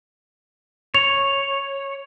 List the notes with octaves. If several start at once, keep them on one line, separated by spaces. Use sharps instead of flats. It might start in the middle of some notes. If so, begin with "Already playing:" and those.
C#5 F7